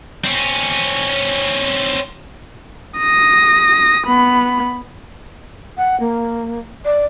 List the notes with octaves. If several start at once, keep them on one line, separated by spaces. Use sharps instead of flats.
C4 C#4
D#6 A#6
B3 B5
F#5
A#3
D5